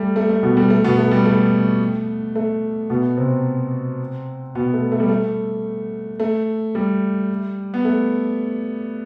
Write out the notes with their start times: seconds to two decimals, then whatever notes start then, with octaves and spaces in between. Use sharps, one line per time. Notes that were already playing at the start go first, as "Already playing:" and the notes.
Already playing: G3 A3
0.16 A3
0.29 A3
0.43 B2 B3
0.57 G3
0.70 A3
0.84 B2 B3
0.98 A3
1.11 G3
1.26 A3
2.35 A3
2.90 B2 B3
3.17 C3 C4
4.55 B2 B3
4.74 A3
4.92 A3
5.00 G3
5.09 A3
6.20 A3
6.75 G3
7.74 B3
7.85 A3